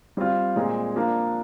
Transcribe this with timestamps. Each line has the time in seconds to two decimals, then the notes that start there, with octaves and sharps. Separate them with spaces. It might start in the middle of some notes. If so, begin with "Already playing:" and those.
0.17 G3 C4 F4
0.56 A#2 G#3 C4
0.96 F3 A#3 D4